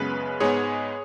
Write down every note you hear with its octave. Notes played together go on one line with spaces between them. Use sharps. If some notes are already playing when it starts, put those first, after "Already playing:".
Already playing: F#2 C#3 G#3 B3 B4
G#2 G#3 B3 G#4 C#5